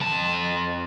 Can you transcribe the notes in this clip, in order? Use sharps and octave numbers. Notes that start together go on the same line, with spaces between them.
F2 A5